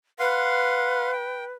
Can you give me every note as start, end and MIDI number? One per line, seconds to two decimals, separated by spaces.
0.19 1.54 71
0.19 1.11 77
0.19 1.11 78
0.19 1.11 84
1.12 1.44 79